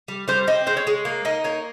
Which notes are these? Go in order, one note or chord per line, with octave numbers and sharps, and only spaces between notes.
G3
G3 C5
C4 D#5
G#3 C5
C#5
G#3
A#3
D#4 D#5
A#3 C#5